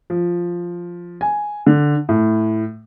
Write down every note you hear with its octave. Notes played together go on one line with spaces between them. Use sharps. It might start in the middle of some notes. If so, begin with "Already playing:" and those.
F3
G#5
D3
A2